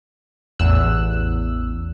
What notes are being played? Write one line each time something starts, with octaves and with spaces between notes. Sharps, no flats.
A1 E2 E6 F#6